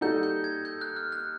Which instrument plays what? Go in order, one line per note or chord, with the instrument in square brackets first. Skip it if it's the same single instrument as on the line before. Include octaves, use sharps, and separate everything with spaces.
[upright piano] G3 A#3 D#4 F#4 A4 [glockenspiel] G6
[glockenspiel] G6
G#6
G6
F#6
F6
F#6